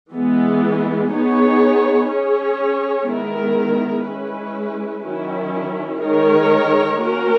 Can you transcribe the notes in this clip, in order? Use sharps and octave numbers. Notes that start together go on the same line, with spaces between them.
E3 G#3 B3
B3 D#4 G#4 C#5
C#4 G#4 C#5
D#3 G#3 B3 E4 A#4
G#3 C#4 E4 B4
D#3 F#3 C#4 E4
D#3 G#3 D#4 A#4 C#5
A#3 C#4 F#4 A#4